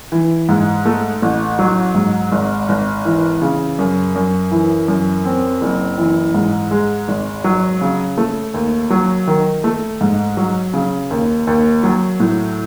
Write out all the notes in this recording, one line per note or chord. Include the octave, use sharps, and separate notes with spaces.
E3
G#2
A3
A1
F#3
G#2
G#1
G#1
E3
C#3
F#2
F#2
E3
F#2
C4
F#1
E3
G#2
G#3
G#1
F#3
C#3
A3
D#2
F#3
D#3
A3
G#2
F#3
C#3
D#2
D#2
F#3
A2